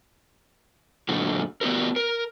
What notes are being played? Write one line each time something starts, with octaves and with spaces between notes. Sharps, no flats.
F#2 A#2 D3 F#4
B3 F#4 G4 A#4
A#4